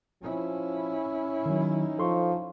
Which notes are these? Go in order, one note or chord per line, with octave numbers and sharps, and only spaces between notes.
F3 C#4 E4
D#3 F#3 D#4
F3 A4 C6 C#6